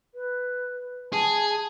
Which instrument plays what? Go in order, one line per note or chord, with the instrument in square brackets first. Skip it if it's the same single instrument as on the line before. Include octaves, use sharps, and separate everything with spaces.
[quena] B4
[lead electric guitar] G#4 [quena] A5
[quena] A5